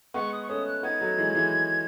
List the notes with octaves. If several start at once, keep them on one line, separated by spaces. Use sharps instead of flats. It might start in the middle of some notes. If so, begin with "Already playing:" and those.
G#3 B3 C#6
D#6
C#6
A3 C#4 D#6
F#6
B3 D#4 G#6
F#3 A3
E3 G#3
E3 G#3